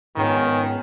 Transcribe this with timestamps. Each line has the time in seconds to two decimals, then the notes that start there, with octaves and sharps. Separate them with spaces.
0.17 C#2 G#2 D#3 B3 C#4